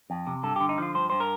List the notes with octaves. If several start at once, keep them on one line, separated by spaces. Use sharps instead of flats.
F2
C3
G2 A4
G4
D3
D#4
F3 F4
G2 C5
G2 C5
A#4